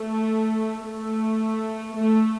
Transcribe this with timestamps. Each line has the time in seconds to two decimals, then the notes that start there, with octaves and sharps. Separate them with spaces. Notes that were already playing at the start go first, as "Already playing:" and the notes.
Already playing: A3
0.86 A3
1.95 A3